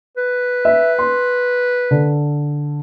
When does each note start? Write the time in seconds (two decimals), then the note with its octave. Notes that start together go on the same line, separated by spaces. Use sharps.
0.17 B4
0.65 E5
0.99 C6
1.91 D3